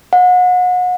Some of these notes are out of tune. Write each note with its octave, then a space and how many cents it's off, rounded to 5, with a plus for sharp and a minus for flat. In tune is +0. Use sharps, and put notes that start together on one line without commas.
F#5 -35